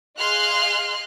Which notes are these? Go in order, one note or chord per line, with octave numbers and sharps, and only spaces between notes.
G#4 D#5 F5 C6 F6 F#6